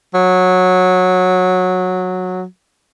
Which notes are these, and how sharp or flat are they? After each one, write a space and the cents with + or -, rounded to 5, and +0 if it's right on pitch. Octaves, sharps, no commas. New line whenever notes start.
F#3 -15